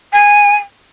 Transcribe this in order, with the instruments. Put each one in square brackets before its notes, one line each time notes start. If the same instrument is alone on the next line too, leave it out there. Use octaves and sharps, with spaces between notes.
[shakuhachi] G#5